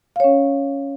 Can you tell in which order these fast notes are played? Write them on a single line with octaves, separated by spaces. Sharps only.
F5 C#5 C#4